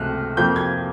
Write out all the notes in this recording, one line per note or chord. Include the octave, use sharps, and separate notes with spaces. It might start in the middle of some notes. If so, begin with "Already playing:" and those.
Already playing: C#2 C3 A3 F6 F#6
F2 C3 F3 A#3 G6
G#6